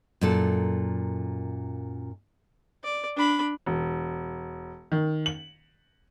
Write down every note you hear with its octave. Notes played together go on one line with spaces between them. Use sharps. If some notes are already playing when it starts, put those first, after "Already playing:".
F#2 A#2 A4
D5
D4 B5
E1
D#3
F#7